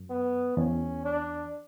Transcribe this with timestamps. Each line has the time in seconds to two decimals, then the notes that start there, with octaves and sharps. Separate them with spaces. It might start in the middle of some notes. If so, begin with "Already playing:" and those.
Already playing: F#2
0.10 B3
0.57 E2 C#4
1.05 D4